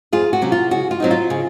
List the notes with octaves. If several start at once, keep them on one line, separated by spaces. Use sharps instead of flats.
F2 F4 G#4
F#4
C3 F#3 C#4
F4
C#3 F#4
F4
F#3 C4 D#4
F4
C#3